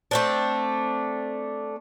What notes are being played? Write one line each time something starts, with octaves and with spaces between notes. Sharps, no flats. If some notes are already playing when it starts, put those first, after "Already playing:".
A3 C4 D4